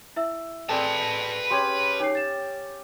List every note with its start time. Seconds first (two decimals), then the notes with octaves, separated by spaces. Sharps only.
0.16 E4 E5 E6
0.69 C4 G#4 A4 B4 D5 A5
1.50 C#4 G4 G#4 C6 G#6
2.00 D#4 G4 C#5 C7
2.15 A6 E7